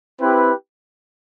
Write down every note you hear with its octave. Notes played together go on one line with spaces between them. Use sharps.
C4 E4 G4 B4